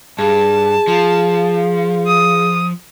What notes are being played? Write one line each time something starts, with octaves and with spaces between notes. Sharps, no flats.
G2 G#4 A5
F3 G#4 F5
D#6